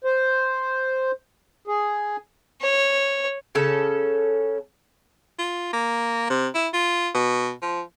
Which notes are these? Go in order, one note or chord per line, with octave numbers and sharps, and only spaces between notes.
C5
G#4
C#5
C#3 C#4 A4
F4
A#3
C3
E4
F4
B2
F3